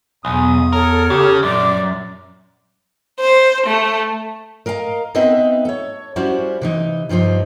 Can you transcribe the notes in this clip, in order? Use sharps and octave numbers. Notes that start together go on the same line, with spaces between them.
B1 E2 G#5 D#6
A4 A#4 C#5 F6
C#3 G4
F#2 A#2 D5 D6
C5
A3
A#4 D#5 F5 F#5 A#5
B3 C4 D#4 B4 D#5 E5
A4 C#5
G3 C#4 E4 F#4 C5
C3 E3 D#4
G2 F3 G3 D#4 C5